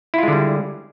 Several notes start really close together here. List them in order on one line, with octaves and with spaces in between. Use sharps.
E4 F4 G#3 D3 G3